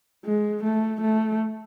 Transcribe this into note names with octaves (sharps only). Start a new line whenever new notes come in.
G#3
A3
A3